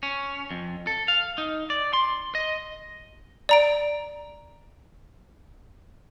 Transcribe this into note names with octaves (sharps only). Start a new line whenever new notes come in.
C#4
F2
A4
F5
D#4
D5
C6
D#5
D5 A#5 D7